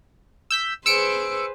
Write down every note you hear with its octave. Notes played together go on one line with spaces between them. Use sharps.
E6 G6 B6
G#4 B4 C5 E6 C#7 D7